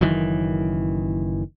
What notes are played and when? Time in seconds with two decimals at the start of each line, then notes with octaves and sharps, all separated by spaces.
0.01 F#1 F#2 D#3 E3